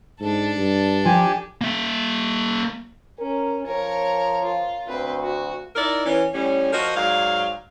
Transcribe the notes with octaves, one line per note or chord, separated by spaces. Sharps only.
G#2 D4 A4
G2
F3 G4 G#5
A#3 E5
C#4 A#4
F3 A#4 C#5
F4
D2 C4 B4
F#4
D#4 E4 A#4 D5
E3 C#4
A2 G3 C#4
F3 F#4 A#4 D#5
G#2 F#3 D5 F5